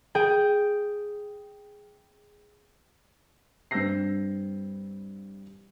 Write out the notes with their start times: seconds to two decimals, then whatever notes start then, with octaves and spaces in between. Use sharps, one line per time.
0.15 G#4 G5
3.71 G2 C4 E6 G6 A#6 C7